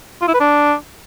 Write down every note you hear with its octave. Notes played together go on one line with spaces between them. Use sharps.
F4
E4
B4
D4